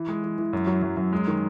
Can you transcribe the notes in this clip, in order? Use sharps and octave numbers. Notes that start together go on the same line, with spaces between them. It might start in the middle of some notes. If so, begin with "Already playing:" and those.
Already playing: E3
G#3
E3
E3
F#2
F#3
F#2
F#2
G#3
D#3